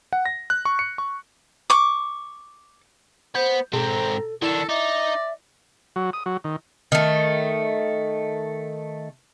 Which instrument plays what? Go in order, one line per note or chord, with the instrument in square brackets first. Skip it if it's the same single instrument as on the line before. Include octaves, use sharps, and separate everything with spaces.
[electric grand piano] F#5
A#6
F#6
C#6
C#7
C#6
[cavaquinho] C#6 D6
[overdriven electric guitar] B3 [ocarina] C5 [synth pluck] G6
[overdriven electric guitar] G#2 C4 [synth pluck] B2 G#4 [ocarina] A4 [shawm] A#5
[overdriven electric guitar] D#3 D4 [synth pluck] E4 E7 [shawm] A4
[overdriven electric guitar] D#4 [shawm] D5 [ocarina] E5
[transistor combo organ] F#3
D#6
F#3
D#3
[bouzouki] D#3 A3